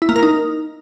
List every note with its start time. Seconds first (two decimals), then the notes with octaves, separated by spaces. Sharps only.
0.02 E4
0.09 A#3
0.16 A#4
0.23 D#4